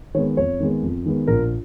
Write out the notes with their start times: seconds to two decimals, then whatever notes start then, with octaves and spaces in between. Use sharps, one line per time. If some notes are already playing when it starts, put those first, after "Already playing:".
0.15 D#3 G#3 B3 C#5
0.37 F2 C#5
0.60 D#3 G#3 B3
0.82 F2
1.05 D#3 G#3 B3
1.27 A#1 A#4